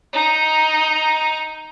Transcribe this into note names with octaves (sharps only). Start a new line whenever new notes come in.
D#4 A#5